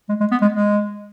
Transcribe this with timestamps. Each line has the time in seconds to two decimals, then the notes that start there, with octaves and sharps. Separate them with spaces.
0.09 G#3
0.20 G#3
0.31 B3
0.41 G#3
0.52 G#3